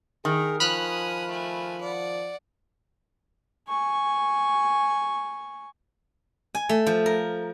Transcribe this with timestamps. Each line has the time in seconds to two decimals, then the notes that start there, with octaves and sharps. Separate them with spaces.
0.25 D#3 G#4 A#4
0.60 F3 G#5 B5 D#6 F6 F#6
1.28 A3 G#5
1.81 D5 F#5
3.69 G#5 C#6
6.55 G#5
6.69 A3
6.87 F3
7.06 A#4